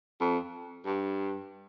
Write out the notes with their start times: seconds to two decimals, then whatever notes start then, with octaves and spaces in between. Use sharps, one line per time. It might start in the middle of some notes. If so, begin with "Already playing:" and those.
0.21 F2
0.86 G2